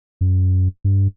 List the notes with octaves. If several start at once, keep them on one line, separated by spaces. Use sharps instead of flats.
F#2
G2